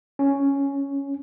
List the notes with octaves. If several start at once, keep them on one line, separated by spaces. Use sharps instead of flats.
C#4